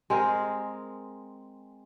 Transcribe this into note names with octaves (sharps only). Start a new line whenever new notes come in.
G#3 C4 G#4 A#4